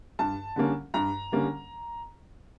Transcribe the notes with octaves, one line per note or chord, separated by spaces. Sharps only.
G2 A5
D3 G3 A#3 C#4
G2 A#5
D3 G3 A#3 C#4